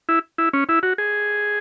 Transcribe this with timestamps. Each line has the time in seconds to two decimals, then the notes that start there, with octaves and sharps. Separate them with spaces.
0.09 E4
0.38 E4
0.53 C#4
0.69 E4
0.83 F#4
0.98 G#4